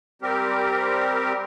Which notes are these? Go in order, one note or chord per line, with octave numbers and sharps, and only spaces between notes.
G3 C4 G4 A#4